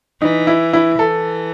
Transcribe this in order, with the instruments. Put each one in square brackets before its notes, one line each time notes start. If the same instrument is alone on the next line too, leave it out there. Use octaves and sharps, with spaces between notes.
[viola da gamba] E3 [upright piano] D#4
[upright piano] E4
E4
[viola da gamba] E3 [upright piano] A4